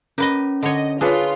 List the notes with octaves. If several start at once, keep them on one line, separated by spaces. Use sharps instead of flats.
A#3 C#4 B4 D#5
D3 C#5 D#5
D4 F4 G#4 B4 C#5